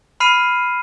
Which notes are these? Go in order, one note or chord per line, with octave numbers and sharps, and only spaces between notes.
B5 F6 C7 D#7